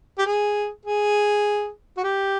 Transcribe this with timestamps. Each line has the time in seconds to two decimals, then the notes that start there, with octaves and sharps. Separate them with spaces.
0.18 G4
0.26 G#4
0.85 G#4
1.97 F#4
2.04 G4